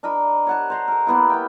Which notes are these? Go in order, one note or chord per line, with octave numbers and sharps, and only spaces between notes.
D4 A#4 D#5 B5
C#5 F#5 A5
C5 A#5 C6
A4 A#4
A#3 B3 E4
A#3 G5